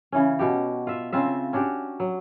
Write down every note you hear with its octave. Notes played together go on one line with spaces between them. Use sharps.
C#3 E3 C#4
B2 F#4 G4
F4 E5
C#3 C4 F4 E5
C#4 D4 F#4 G4
F#3